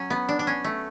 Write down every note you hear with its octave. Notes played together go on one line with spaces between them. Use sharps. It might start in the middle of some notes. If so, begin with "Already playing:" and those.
Already playing: F#3 C#4
B3
D4
D4
C#4
A3